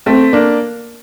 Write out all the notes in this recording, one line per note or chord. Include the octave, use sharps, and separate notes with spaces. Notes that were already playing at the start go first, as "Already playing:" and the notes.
A3 C4
A#3 D4